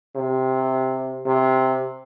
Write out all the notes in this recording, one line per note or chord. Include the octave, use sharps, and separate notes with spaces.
C3
C3